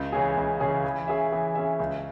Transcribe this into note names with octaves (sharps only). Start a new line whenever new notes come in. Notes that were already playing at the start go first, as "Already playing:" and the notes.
Already playing: C#2
C#3 E3 C#4 G#4
C#2
C#3 E3 C#4 G#4
E3
C#4 G#4 E5
E3
C#4 G#4 E5
C#2